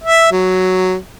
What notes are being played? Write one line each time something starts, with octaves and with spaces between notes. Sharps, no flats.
E5
F#3